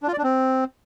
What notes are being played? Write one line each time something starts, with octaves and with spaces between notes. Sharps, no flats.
D4
F4
D5
D4
C4